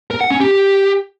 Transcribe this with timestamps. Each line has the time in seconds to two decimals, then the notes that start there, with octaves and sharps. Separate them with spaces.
0.11 A#4
0.21 F#5
0.30 C#4
0.40 G4